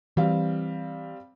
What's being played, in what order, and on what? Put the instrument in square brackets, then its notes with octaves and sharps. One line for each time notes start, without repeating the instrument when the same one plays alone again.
[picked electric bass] E3 [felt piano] G3 C4 F5